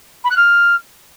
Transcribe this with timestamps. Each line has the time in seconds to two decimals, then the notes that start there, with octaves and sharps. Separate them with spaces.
0.24 B5
0.31 F#6
0.37 F6